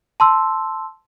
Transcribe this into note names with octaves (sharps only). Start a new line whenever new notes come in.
A5 C6 E6